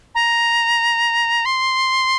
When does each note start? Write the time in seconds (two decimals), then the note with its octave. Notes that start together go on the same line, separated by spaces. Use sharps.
0.15 A#5
1.45 C6